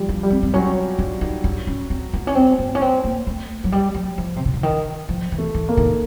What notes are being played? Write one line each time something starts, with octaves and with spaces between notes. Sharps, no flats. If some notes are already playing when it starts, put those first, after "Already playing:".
Already playing: F3 G3
D4
G3
C4
C4
F#3 C#4
D4
D#4
D4
C#4
C4
B3
C#4
C4
B3
C#4
C4
A#3
A3
F#3
G3
F#3
F3
C3
C#3
D3
D#3
F3
E3
A3
E3
A#3
D#3